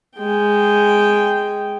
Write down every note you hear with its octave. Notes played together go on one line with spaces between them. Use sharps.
G#3 G5